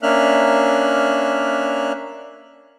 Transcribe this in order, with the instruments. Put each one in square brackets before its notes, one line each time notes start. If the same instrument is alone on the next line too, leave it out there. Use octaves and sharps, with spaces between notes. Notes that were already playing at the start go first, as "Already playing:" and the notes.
[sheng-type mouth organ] A#3 C#4 D4 E5 F6 F#6